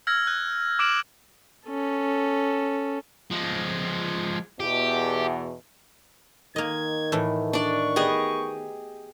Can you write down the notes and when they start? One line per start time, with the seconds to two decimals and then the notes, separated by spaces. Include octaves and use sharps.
0.07 E6 F6 G#6 A#6
0.27 F#6
0.79 D6 E6 F6 D7 E7 F#7
1.67 C#4 A4
3.31 F3 G#3
4.60 E2 B2 G4
6.56 D#3 A#3 D#5 G#6
7.12 A2 E3 A3
7.53 D4 D5 C#6
7.96 B3 G4 G#4 D#5